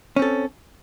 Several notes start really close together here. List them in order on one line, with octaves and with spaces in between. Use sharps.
C#4 C4 A4